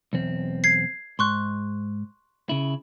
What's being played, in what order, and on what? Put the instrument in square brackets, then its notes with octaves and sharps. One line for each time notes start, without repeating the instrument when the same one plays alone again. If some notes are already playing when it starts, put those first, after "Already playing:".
[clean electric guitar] B1 E2 C4
[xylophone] G#6 C7
[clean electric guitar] G#2 [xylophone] C6 C#6 F#6
[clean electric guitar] C#3 E4